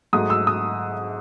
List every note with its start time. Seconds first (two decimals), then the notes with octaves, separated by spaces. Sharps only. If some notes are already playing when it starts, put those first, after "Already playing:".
0.13 G#2 F#3 A3 D#6
0.30 E6
0.47 D#6